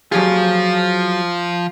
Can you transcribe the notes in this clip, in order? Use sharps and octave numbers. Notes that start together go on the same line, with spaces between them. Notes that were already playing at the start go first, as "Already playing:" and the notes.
F3 F#3 F4 G4 G#4